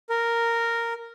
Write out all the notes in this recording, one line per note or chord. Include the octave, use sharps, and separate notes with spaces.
A#4